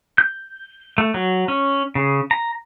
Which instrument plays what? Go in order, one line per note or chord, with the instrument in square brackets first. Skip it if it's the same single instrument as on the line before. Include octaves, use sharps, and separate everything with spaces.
[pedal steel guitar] G6
A3
F#3
C#4
C#3
A#5